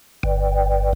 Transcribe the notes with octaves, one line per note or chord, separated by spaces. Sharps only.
G1